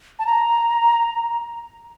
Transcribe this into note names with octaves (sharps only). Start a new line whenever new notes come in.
A5
A#5